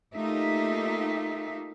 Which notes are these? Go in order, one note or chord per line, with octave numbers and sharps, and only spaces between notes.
A3 A#3 D#4 F4 G4 E5